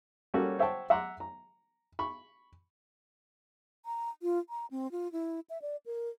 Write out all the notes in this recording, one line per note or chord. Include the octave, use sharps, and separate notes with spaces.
G3 A#3 C#4 F#4 A4 C#5
C5 C#5 E5 F#5 G5 A5
E5 F#5 A#5 C6 D6 F#6
A#5
B5 C#6
A#5
F4
A#5
C4
F4
E4
E5
D5
A#4